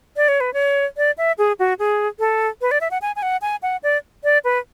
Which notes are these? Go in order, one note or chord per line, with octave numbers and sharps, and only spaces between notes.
D5
C#5
B4
C#5
D5
E5
G#4
F#4
G#4
A4
B4
D5
E5
F#5
G#5
G#5
F#5
G#5
F#5
D5
D5
B4